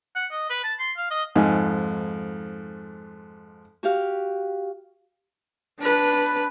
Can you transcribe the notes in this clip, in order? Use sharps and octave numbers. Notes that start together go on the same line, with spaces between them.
F#5
D#5
B4
A5
C6
F5
D#5
F2 G#2 D#4 G#5
F#4 G4 F5
D4 B4